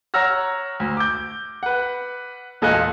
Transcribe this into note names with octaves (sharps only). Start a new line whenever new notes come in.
C#5 F#5 A#5 E6 F6 A#6
D2
D6 G6
B4 F#5
E1 A#2 A4 D#5 G#5 F#6